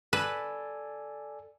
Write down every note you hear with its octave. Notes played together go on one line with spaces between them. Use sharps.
A4 B4 D5 G#5